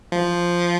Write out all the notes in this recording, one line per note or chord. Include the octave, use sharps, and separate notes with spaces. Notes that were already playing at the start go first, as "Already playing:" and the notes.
F3